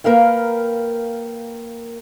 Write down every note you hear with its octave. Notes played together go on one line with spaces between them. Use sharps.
A#3 A#4 B4 F5 G5